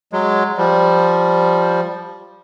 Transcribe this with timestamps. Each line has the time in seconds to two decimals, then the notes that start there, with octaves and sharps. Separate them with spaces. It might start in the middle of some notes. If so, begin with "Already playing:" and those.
0.13 F#3 G#3
0.57 F3 G3